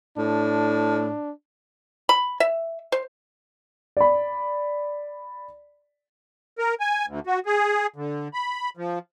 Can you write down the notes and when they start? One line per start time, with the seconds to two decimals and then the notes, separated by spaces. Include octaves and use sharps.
0.18 A2 D4
2.09 B5
2.40 E5
2.92 C5
3.97 D5 B5
6.59 A#4
6.80 G#5
7.07 D2
7.27 F#4
7.46 G#4
7.96 D3
8.34 B5
8.77 F3